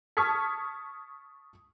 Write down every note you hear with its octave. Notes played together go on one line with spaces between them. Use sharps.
A5 C#6 D#6 F6 G#6 B6